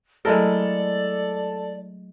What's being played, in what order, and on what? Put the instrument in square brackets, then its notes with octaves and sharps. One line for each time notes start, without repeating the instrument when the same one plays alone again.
[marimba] F#3 A3 [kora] G#3 E4 A#4 [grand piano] A4 [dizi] D5